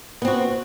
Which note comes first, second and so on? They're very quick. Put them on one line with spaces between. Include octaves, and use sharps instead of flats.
B3 C4 F#4